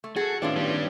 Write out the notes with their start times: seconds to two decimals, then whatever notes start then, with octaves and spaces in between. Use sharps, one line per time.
0.04 A3
0.16 F#4 G#4 A4 A5
0.42 A2 D#3 B3 C#4 D4 F4 G4
0.56 G3 D4